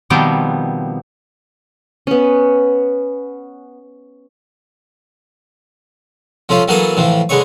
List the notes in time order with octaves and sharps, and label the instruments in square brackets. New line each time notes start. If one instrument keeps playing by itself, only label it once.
[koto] B2 D#3 F3 G3 B3 C4
[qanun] B3 C#4
[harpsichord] F3 A3 C#4 F4
E3 F#3 A#3 B3 G#4 A4
A2 E3 F3
D3 G#3 B3 C#5 C#6